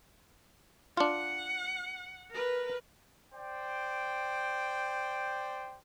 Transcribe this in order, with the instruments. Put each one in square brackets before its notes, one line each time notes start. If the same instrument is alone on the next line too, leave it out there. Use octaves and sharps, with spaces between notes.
[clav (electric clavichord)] D4 F4 [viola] F#5
[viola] A#4 B4
[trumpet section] C5 D5 G5